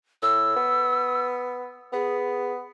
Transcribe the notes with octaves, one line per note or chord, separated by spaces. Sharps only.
A2 E6
B3
B3 G#4